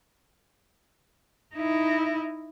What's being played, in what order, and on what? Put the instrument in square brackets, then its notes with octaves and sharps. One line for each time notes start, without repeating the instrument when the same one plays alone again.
[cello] D#4 E4